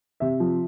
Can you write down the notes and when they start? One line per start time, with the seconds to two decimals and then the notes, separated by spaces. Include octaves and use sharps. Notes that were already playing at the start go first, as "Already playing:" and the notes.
0.20 C3 E5
0.40 F3